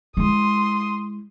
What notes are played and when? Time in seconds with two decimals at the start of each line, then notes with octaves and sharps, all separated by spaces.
0.17 G#3 E4 C6 D#6